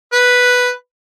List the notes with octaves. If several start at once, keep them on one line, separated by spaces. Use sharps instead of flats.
B4